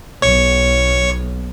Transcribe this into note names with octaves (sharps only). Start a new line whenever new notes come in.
B1 C#5 C#6